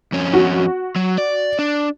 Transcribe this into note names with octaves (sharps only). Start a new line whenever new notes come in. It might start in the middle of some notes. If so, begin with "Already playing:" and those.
F2 C#4
F#4
F#3
D5
D4